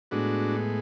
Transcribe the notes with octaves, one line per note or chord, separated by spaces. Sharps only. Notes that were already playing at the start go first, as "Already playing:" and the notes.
A2 G#3 B3 D4 F#4